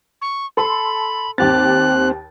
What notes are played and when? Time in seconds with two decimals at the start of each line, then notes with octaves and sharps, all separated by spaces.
0.22 C#6
0.57 A4 B5 C6
1.38 D#2 C4 G4 F#6 A6